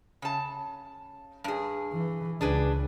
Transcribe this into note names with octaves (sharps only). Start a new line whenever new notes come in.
C#3 A5
G2 G#4
E3
C#2 D4 G#4 B4